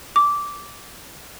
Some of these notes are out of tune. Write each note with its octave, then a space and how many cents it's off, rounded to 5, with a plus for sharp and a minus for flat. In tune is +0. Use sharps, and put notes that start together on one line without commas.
D6 -10